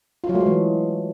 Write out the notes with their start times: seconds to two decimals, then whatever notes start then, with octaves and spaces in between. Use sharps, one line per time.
0.24 F4
0.29 F#3
0.35 A3
0.41 G#3
0.46 E3